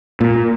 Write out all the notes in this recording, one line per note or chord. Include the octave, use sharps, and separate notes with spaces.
A#2